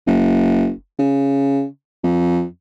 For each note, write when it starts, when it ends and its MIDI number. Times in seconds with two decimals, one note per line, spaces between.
0.07 0.70 30
0.99 1.64 49
2.03 2.45 41